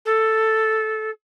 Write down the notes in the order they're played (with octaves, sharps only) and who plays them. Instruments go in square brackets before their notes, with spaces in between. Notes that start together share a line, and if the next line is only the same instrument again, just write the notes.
[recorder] A4